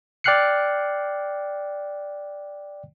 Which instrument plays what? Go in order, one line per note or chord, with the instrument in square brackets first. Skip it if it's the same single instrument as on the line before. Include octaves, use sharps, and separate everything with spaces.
[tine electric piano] D5 G5 F6 F#6 C7 C#7